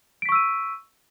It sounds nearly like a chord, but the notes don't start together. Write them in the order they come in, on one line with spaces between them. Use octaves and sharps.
D7 B6 C#6 E6 D#7